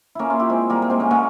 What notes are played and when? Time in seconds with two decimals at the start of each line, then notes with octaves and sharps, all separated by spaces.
0.15 A#3 C#4 E4
0.30 C#4 F4
0.39 E4 G4
0.49 G#3 C4
0.70 G3 A#3
0.82 A#3
0.90 G#3 C4
1.00 A#3 C#4
1.11 A#3 C#4